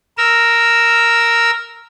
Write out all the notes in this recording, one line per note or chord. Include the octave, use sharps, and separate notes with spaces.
A#4 E6